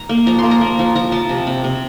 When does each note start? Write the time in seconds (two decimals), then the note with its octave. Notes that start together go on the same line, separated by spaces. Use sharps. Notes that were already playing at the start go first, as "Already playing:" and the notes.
Already playing: A#5
0.09 A#3
0.26 F3 A#5
0.39 C6
0.44 A#3
0.51 A#5
0.61 A#3
0.79 F3
0.95 F3 A#5
1.12 F3 A5
1.29 C3
1.47 C3
1.64 C3